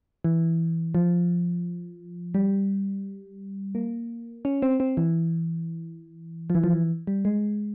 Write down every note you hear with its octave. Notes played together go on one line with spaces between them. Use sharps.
E3
F3
G3
A#3
C#4
C4
C4
E3
F3
E3
F3
E3
G3
G#3